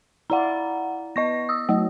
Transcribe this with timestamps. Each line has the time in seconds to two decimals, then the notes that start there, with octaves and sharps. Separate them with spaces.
0.30 E4 D5 F5 F#5 A#5
1.16 B3 D#5 C#6 A#6
1.49 D#6 E6
1.69 F#3 A3 D#5